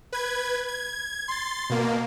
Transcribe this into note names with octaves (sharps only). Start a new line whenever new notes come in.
B4 G#6
G#6
C6 A6
B2 A#3